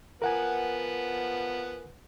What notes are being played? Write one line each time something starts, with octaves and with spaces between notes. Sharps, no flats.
F3 B3 A#4 B4 F#5 G#5